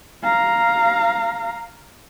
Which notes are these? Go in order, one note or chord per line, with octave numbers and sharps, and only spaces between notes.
F5 A#5